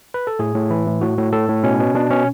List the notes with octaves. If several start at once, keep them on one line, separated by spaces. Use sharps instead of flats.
B4
A4
A2 G#4
A2
E3 E4
A2
A2 F#4
A2
A2 A4
A2
B2 C#4
B2
B2 D4
B2 C#4